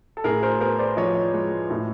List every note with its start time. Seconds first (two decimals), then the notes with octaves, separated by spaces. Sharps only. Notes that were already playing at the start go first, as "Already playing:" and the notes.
0.17 A4
0.24 A2 G#4 A#4
0.43 A#4 C5
0.60 B3 A#4 C5
0.79 C5 D5
0.97 F3 C#5 D#5
1.34 G#3
1.70 A2